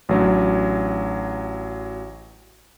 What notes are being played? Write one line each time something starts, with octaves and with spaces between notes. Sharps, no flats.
A1 F#3 D4